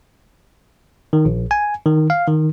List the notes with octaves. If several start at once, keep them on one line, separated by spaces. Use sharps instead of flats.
D#3
A#1
G#5
D#3
F5
D#3